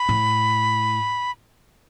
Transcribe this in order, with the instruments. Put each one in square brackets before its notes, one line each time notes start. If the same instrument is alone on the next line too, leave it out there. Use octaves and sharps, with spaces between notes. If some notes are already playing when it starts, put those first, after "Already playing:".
Already playing: [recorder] B5
[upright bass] A2